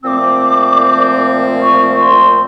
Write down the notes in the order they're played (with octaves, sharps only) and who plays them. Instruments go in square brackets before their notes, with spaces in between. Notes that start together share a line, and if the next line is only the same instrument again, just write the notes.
[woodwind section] A#2 F3 A3 C4 [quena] D6 E6
[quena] C#6
C6